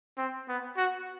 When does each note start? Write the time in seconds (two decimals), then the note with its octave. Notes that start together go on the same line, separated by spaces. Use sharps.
0.18 C4
0.48 B3
0.77 F#4